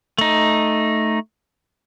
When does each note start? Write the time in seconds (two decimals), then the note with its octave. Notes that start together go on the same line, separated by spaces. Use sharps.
0.18 A3 D#4